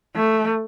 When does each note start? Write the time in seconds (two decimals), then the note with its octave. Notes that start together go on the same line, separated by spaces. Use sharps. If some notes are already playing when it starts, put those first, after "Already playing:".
0.15 A3